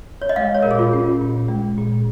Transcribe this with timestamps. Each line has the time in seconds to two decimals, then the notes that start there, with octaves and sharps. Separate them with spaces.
0.22 C#5
0.29 D#5
0.36 G#3 F5
0.55 C#5
0.62 A#2 A#4
0.71 G#4
0.79 F4
0.93 C#4
1.21 A#2
1.48 G#3
1.78 A#2